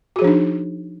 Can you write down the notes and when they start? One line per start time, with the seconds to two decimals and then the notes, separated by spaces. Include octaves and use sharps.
0.16 F#4
0.19 G#4
0.22 F3
0.24 D4
0.27 D#4